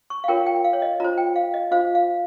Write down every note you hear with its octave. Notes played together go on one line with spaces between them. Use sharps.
C#6
F5
F4 A#4 C#5 G5
G5
F5
C#5
D#5
F4 C5 A#5
G5
F5
D#5
F4 C5 F5
F5